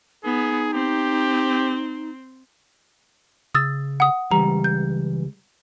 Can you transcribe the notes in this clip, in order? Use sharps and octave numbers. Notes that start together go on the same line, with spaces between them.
B3 D#4 G#4
C4 G4
C#3 D#6 E6 A6
F#5 D#6
C#2 E3 G3 A#5
G6